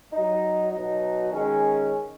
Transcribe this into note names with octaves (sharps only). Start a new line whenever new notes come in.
F#3 D#4
B2 F#3 D#4
D#3 G#3 C#4